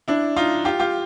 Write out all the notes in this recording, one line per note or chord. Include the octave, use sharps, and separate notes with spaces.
D4 E4
D#4 F4
F4 G4
F4 G4